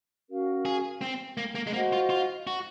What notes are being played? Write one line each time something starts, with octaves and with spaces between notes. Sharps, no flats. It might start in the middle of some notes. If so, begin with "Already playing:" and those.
C#4 F#4 A#4 F5
G#4
C4
A#3
A#3
G#3
A#3 F#4 C5 D#5 F#5
F4
F4
F#4